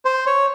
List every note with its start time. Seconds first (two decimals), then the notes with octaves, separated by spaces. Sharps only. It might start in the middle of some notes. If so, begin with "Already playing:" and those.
0.05 C5
0.27 C#5